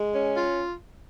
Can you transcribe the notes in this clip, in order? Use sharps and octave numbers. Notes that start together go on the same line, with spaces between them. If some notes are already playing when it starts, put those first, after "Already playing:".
Already playing: G#3
C#4
F4